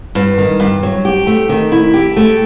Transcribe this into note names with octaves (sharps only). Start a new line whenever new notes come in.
G2
D#3
G2
F#3
G4
A3
D#3
E4
G4
A3